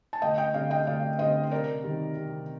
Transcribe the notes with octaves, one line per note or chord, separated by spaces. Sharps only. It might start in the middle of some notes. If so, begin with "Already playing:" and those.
A5
D2 D#5 G5
D#5 G5
D3 G3 C4 D5 F5
D#5 G5
D2 D5 F5
D3 G3 C4 C5 D#5
C5
C3 A#4 D5
D#3 G3 C4
C3